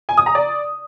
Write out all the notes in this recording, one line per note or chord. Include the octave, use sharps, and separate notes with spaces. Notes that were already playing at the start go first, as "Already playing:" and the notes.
G#5
D#6
A#5
D5